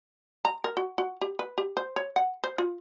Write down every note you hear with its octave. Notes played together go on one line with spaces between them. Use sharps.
A#5
A#4
F#4
F#4
G4
B4
G4
C5
C#5
F#5
C5
F4